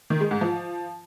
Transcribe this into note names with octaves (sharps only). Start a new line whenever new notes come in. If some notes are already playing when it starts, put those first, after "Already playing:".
D#3
G#3
G#2
F3